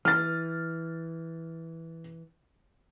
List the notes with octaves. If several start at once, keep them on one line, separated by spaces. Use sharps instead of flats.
E3 F6 A6